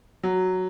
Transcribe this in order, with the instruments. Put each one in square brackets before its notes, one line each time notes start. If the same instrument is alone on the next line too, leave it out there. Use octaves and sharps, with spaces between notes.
[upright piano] F#3